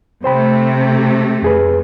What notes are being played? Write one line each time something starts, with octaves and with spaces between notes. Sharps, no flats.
C3 A3 C5 G5 B5
F2 G#4 B4